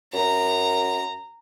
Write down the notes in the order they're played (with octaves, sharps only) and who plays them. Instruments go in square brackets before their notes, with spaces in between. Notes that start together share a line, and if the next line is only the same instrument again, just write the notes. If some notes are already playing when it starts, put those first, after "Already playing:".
[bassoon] F#2 [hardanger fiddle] A#5